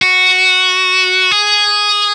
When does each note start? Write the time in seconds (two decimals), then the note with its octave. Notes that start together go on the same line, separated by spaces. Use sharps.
0.02 F#4
1.31 G#4